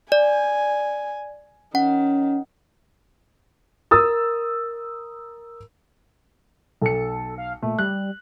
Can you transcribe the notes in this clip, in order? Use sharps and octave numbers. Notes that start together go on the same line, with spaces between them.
D5 G#5
D#3 C#4 F#5
A#4 D#6 E6 A6
B1 A4 C#7
F5
A#2 A3
G3 F#6